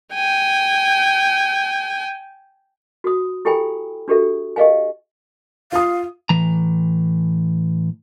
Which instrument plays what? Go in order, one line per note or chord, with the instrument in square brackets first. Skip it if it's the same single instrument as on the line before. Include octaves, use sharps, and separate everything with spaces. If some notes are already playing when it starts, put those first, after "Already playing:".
[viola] G5 G#5
[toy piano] F#4 D#6
E4 G4 A4 G5 G#5 B5
D4 F#4 G4 A4 E5
G4 D#5 F5 G#5
[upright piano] F4 D#6 [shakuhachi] F5
[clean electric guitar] A2 E3 A#5